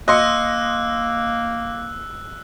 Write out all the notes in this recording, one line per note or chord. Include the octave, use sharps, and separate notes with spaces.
A#3 D#5 C6 E6 F#6 C#7